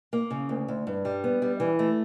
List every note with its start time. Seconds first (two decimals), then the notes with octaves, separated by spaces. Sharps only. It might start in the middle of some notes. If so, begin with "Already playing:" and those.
0.13 A#3
0.30 C#3
0.49 D2
0.68 D2
0.87 G2
1.05 G3
1.24 B3
1.42 G3
1.60 E3
1.79 A3